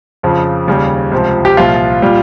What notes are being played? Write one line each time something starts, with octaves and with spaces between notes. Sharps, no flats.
F2 C#3 F3
D#2 C#3 G3
C#2 C3 F3
G4
C2 A#2 F3 F4
A#2 G3